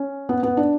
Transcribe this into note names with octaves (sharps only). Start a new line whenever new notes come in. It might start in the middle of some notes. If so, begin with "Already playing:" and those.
Already playing: C#4
B3
B3
D4